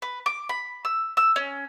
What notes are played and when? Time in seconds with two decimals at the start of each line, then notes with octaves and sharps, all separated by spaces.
0.02 B4
0.26 D6
0.49 B5
0.85 E6
1.17 E6
1.36 C#4